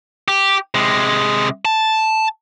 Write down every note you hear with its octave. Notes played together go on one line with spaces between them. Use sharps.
G4
C3 G#3
A5